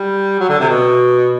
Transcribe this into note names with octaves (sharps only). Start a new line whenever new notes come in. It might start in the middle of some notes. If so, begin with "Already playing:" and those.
Already playing: G3
F#3
D3
C3
B2